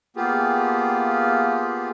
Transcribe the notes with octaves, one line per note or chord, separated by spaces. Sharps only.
A#3 B3 F4 G4 G#4